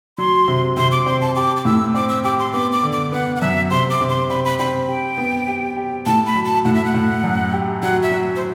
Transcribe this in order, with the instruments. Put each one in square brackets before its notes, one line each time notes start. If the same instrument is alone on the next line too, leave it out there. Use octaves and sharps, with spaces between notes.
[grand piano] F#3 [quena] C6
[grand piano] C3
[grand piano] C3 [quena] C6
[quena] D6
[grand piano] C4 [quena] C6
[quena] A5
[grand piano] G4 [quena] D6
[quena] D6
[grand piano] A2 [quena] E6
[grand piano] C4 [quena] D6
[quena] E6
[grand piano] G4 [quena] D6
[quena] C6
[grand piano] B3 [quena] D6
[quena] D6
[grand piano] D3
[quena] D6
[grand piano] B3 [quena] F#5
[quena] F#5
[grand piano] F#2 [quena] E5
[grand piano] C3 [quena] C6
[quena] D6
[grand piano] C3
[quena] C6
[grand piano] C4 [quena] B5
[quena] B5
[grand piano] C4 [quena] B5
[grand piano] G4 [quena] G5
[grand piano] B3
G4
G4
[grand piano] A2 [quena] A5
[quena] B5
[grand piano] F#3
[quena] A5
[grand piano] A2 [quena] F#5
[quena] E5
F#5
[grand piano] A2
F#2
G4
[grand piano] F#3 [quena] F#5
[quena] E5
[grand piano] F#3
[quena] C5